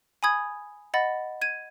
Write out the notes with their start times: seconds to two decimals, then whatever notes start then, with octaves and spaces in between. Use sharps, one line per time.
0.23 G#5 B5 D#6 G#6
0.94 D#5 F#5 B5 A6
1.42 G#6 D#7